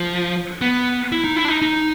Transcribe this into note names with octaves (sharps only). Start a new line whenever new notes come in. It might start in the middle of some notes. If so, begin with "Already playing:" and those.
Already playing: F3
B3
E4
D#4
E4
D4
D#4
D#4